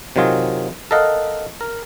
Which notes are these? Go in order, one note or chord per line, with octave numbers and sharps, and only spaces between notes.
C3 D#3 F#3 F4 G#4
A4 A#4 D#5 F5 F#5
A#4